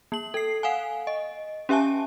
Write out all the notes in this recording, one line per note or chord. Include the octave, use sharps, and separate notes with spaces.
A#3 F#7
A4 C7
F5 F#5 G#5
D#5
C#4 G4 E5 G#5 A5